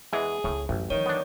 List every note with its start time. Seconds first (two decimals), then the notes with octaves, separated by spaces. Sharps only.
0.13 E2 E3 G#3 G#4
0.44 C#2 A2 C4
0.69 A1 F#2
0.90 D#3 E3 F#3 C#5
1.06 B3 D4